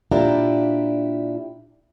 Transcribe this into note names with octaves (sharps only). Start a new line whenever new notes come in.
A#2 D4 E4 F4 G4 A#5